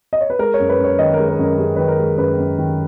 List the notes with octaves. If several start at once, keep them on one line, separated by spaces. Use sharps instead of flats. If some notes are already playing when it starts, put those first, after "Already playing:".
D#5
C#5
B4
G#3 A#4
C#5
F#2
B4
F#2
C#5
D#3 D#5
A#4
G#3
A#4
F#2 A#4
F#2 G#4
D#3 B4
A#4
G#3
F#2 B4
F#2
D#3